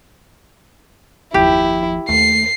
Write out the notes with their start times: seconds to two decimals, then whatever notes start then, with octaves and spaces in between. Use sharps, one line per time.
1.34 F#1 D#2 F3 E4 G4
2.09 D#2 A3 C7